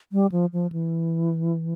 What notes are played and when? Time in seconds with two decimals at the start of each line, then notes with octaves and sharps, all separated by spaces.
0.12 G3
0.32 F3
0.53 F3
0.72 E3